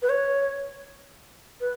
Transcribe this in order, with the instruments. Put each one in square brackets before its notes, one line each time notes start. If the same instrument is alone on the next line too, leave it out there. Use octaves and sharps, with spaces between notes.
[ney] B4
C#5
B4